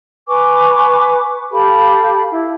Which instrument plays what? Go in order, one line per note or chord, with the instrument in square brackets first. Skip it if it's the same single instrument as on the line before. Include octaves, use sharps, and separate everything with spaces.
[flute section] B4 G#5 C#6 D6
G4 A4 F5 B5
E4